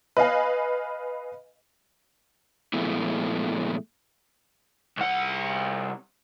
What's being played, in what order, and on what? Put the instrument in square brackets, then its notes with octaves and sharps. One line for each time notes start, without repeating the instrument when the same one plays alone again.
[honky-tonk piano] B4 D#5 F5 G#5
[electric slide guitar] A#2 F3 G#3 A3 B3 E4
[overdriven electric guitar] C2 F#5